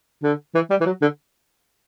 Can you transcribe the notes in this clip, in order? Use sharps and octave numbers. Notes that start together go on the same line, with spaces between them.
D3
E3
G3
E3
F#3
D3